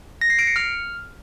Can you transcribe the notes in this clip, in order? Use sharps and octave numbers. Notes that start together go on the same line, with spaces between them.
A#6
C7
D7
C#7
F6